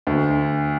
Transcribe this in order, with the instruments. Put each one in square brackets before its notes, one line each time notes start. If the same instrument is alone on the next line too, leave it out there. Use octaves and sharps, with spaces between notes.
[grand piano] D2